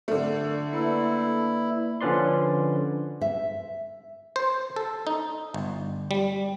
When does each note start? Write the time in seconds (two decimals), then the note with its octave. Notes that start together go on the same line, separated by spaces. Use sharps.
0.08 D3 A3 D5
0.73 A#3 E4 B4 D5
2.01 D3 F3 C#4 B4 D5 C6
3.21 E5
4.36 C5
4.76 A4
5.07 D#4
5.54 G1
6.11 G3